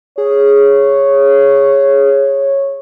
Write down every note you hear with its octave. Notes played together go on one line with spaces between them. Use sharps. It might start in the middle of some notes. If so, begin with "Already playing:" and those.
G#4 C#5